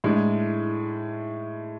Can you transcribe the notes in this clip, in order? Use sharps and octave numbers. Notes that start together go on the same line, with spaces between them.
A2 G#3 D4